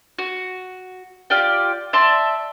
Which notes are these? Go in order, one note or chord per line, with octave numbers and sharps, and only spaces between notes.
F#4
F4 G4 D5 G5
D5 E5 A5 C6